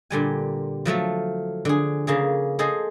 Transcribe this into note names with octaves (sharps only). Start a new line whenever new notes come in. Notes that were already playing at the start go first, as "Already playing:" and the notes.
A#2 D3 G3 G#5
F3 F#3 A3 A4
D3 G#4
C#3 A#3 G#4
G#4 A4 C5 D#5